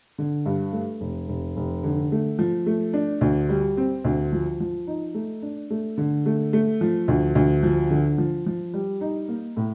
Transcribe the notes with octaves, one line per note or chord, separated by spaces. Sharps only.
D3
G2
A3
F1
F1
F1
D3
A3
F3
A3
D4
D2
G3
C4
D2
F3
F3
D#4
A3
D4
A3
D3
A3
A3
F3
D2
D2
F3
D3
F3
F3
G3
D#4
A#3
A2